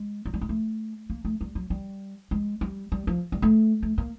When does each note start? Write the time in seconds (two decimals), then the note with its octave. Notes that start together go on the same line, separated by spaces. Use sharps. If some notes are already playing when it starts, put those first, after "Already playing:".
Already playing: G#3
0.25 F#3
0.34 G3
0.41 G#3
0.49 A3
1.10 A#3
1.25 A3
1.41 G3
1.55 F#3
1.70 G3
2.31 G#3
2.61 G3
2.92 G3
3.07 F3
3.32 G3
3.42 A3
3.83 A3
3.98 A#3